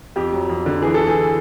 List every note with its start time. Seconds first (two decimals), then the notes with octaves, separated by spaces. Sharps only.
0.16 F2 G4
0.33 F#3
0.49 F2
0.66 D3
0.82 E3 G#4
0.94 A4
0.99 E3
1.07 G#4